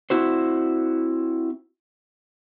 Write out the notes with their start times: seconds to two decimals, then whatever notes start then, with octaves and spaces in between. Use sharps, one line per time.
0.10 C4 E4 F#4 C5